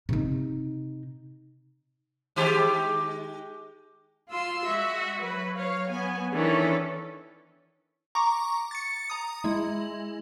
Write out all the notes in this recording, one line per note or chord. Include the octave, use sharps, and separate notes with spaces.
C3 D#4
D#3 G#3 G4
F4 F5 C6 E6
G#3 F#4 E5
F#3 B4
C#5 F5
B3 G#5
D#3 E3 C#4 D4 E4 A4
A#5 C#6 D6
A6 C#7
A#5 D#6
G#3 E4